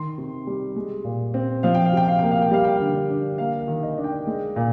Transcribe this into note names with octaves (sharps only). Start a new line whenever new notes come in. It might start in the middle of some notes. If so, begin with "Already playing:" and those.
Already playing: D#3 C6
C3
G3
G#3
A#2
C4
F3 F5
G5
F5
C3 G5
F5
A#3 G5
F5
G5
G3 F5
G5
D3 F5
D4
A#3 F5
F5
D#3
D#5
D4
G5
G#3
A#2